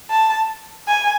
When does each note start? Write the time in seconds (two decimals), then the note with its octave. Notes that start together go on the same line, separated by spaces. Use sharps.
0.11 A5
0.88 G#5